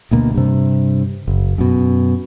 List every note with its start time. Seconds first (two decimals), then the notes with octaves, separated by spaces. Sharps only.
0.11 D2 B2 A#3
0.34 G2 C3
1.28 F#1
1.58 F#2 B2